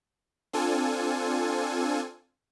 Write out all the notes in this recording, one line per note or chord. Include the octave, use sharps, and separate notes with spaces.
C4 D4 F4 A4 G#5